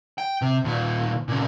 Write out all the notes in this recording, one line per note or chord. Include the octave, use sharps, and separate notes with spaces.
G5
C3
D#2 A#2
A#2 C#3